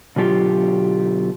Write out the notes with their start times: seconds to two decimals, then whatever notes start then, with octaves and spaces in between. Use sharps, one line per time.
0.16 B2 D3 F#3 F4 G4